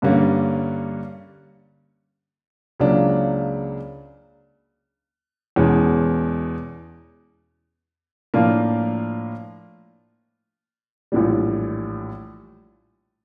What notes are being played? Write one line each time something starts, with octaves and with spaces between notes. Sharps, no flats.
G2 D3 G3 A#3 C#4
C#2 C#3 F#3 A#3 D4
E2 B2 G#3 C#4
A2 F3 A#3 D4 F4
A#1 A2 E3 G3